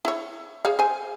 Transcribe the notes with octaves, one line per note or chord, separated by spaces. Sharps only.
E4 C#5
G#4 C#5 F5
C5 G#5